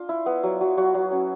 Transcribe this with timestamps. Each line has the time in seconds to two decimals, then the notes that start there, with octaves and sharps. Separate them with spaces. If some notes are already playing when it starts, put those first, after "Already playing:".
Already playing: D4 F4
0.09 E4
0.26 B3
0.43 F#3
0.61 F#3
0.77 F#3 F#4
0.94 F#3
1.11 C#4